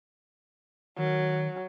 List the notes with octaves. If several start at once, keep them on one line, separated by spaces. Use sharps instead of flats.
D#3 F#3